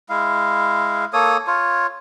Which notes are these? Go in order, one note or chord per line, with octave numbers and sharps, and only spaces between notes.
G#3 E4 F5
A#3 A4 C#5 D#6
F4 C#5